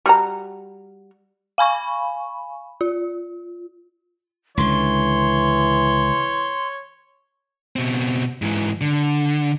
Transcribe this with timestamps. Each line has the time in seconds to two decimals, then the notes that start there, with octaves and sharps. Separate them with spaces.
0.06 G3 F#4 A#5
1.58 F5 G#5 B5 C#6
2.81 F4
4.57 C#2 D3 E3 C#5 C6
7.76 B2 C4
8.42 G#2 E3
8.81 D3